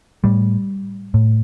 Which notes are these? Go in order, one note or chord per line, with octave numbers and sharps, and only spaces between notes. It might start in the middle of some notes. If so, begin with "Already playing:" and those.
A2 G3
A2